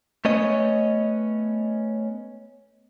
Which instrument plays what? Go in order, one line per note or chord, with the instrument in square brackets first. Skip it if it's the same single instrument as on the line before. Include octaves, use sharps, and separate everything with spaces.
[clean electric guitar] A3 B3 C#4 C#5 D#5